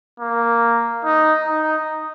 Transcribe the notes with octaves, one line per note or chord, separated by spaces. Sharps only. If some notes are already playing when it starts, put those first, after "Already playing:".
A#3
D#4
D#4